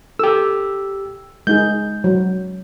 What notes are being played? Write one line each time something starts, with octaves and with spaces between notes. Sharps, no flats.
G4 A4 E6
G#3 D#4 G#4 G6
F#3